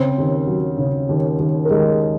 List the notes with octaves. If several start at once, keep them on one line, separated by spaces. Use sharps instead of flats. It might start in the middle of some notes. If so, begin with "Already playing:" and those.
Already playing: C#3 C4 C5
D#2
F#3
C#3
D#2
D#2
A#4
D#2 G#3 G#4